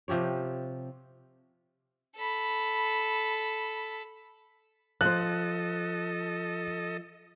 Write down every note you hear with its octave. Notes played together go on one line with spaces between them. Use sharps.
C3 F3 G4 C#5
A4 B5
F3 A4 C5 D#5 F#6